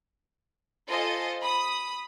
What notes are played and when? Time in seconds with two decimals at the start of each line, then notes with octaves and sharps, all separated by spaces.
0.88 F4 A4 C5 D#5 G#5
1.41 B5 D#6